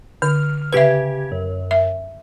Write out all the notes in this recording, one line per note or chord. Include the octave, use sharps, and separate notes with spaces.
D3 F6
C#3 G4 B4 E5 G#6
F#2
E5